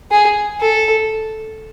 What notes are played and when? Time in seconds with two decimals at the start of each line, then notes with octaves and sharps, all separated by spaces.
0.11 G#4
0.60 A4